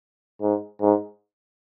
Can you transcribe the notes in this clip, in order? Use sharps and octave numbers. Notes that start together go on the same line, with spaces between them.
G#2
G#2